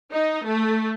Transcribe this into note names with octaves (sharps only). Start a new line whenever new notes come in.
D#4
A3